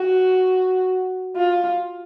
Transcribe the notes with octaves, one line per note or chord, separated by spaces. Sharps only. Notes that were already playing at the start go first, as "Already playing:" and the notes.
Already playing: F#4
F4